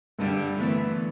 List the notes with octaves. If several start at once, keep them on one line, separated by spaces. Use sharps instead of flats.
G2 D3 G3
D3 E3 A3 B3